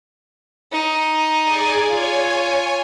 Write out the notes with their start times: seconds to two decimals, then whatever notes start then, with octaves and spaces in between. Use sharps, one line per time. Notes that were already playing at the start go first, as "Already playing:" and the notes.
0.73 D#4
1.43 G#4 D5 G#5
1.89 F4 C#5 G#5